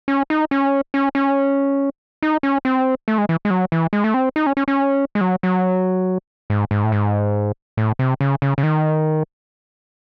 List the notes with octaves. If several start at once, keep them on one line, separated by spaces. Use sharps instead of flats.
C#4
D#4
C#4
C#4
C#4
D#4
C#4
C4
A3
G#3
E3
G#3
F#3
E3
G#3
A3
C4
D#4
C#4
C#4
C#4
G#3
F#3
F#3
G#2
G#2
A2
G#2
A2
C3
C#3
C#3
C#3
D#3